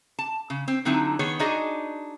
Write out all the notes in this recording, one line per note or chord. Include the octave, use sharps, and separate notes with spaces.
A5
C#3
C4
D3 F#3 C4 D#4 E4
D#3 B3 G#4 C#5
D4 D#4 F#4 G#4 D5 D#5